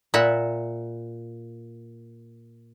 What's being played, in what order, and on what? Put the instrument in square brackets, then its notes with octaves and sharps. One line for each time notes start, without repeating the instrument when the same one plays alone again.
[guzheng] A#2 E5 F#5 B5